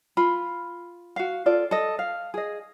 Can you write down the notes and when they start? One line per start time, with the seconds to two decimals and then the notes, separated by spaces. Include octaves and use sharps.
0.17 F4 B5
1.16 F#4 F5
1.46 F4 A4 D5
1.71 A4 D#5
1.99 F5
2.34 G#4 D#5